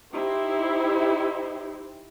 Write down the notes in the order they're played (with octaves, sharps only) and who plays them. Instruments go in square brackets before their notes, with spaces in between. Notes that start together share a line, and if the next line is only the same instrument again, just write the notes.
[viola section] D#4 E4 G4 C5